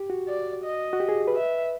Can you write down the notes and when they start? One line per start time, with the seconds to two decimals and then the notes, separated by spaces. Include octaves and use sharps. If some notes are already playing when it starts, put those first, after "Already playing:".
Already playing: G4
0.10 F#4
0.28 D5
0.64 D#5
0.93 F#4
1.00 G4
1.09 G#4
1.28 B4
1.36 E5